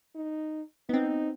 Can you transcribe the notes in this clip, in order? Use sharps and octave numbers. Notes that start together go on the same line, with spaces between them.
D#4
B3 C4 D#4